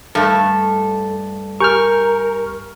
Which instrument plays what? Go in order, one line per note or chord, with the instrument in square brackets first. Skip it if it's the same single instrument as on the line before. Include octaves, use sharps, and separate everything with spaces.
[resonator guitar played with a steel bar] G2 A3 [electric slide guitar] A4
[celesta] G4 G#5 G6 [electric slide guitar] A#4 [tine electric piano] C#6 F6